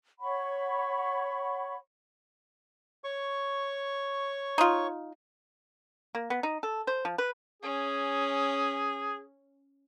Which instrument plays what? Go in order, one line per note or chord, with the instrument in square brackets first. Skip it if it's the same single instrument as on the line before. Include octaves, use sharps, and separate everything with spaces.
[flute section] C#5 F#5 B5 C#6
[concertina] C#5 C#6
[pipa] D#4 F4
A#3
B3
D#4
A4
C5
F3
B4
[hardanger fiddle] C#4 [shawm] G#4